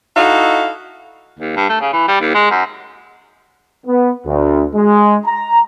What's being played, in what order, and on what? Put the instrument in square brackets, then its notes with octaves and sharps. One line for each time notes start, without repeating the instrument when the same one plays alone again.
[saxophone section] D#4 E4 F#4 A4 D#5 F5
[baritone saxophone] D#2
G2
A3
C#3
E3
G3
D#2
G#3
F#2
[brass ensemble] B3
D2
G#3
A#5